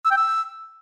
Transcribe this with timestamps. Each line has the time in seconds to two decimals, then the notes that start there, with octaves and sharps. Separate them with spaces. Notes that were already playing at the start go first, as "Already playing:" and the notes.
0.05 E6
0.11 G5
0.17 E6